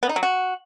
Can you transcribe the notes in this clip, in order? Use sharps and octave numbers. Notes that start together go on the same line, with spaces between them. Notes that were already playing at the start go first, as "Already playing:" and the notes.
B3
D#4
F#3
F#4